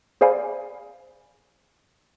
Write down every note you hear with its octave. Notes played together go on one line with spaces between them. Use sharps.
G#4 C5 D5 F5 G#5 B5